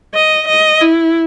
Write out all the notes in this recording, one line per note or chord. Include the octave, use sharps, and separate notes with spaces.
D#5
D#5
E4